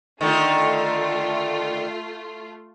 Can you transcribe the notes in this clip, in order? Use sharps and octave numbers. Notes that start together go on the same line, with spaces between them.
D3 D#3 A3 F4